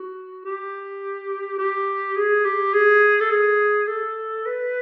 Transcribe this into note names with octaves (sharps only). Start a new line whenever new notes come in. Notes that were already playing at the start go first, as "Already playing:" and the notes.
Already playing: F#4
G4
G4
G#4
G4
G#4
A4
G#4
A4
B4